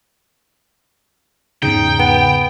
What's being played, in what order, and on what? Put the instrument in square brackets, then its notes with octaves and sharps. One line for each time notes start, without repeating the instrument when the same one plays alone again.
[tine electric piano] E2 G#2 C#3 [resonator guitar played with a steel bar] D#4 [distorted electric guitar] G5
[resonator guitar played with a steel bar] B3